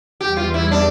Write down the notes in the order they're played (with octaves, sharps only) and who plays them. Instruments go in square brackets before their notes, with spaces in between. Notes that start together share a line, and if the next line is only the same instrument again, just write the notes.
[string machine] E2 E3 G3 [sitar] G4
[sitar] F4
E4
D4